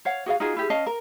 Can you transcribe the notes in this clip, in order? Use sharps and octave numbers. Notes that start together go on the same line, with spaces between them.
C#5 F5 F#5
F#4 G#4 E5 F5
D#4 F4 F#4 G#4
E4 G4 G#4
C#4 D#5 F5 A5
A#4